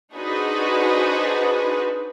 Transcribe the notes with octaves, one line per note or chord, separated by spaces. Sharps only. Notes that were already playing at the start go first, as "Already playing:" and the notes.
D4 D#4 F#4 G#4 B4 C5